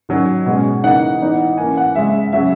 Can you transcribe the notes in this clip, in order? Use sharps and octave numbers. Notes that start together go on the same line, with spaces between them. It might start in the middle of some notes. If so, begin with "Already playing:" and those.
D#3 F#3 C#4
B2 G#3 C#4
C#3 E3 A#3 D#4 F#5
E3 B3 D#4
E3 A#3 C#4 G#5
F#5
C#3 G#3 C#4 E5
C#3 F#3 C#4 E5